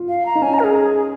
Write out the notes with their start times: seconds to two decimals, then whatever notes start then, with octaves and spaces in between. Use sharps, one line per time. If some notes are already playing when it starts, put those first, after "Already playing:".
Already playing: F4
0.09 F5
0.26 A#5
0.35 D#4
0.42 C#4 G#5
0.54 A#5
0.59 A#4
0.64 G#4